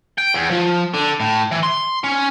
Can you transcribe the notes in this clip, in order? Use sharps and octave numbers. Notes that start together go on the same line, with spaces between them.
G5
E2
F3
D3
A2
E3
C6
C#4